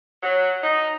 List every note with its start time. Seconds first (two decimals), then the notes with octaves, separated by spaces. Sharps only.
0.23 F#3
0.63 D#4